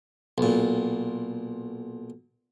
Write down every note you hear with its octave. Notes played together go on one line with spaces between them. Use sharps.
B1 A#2